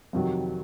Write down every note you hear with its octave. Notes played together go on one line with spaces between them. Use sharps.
F2 C3 D#3 F#3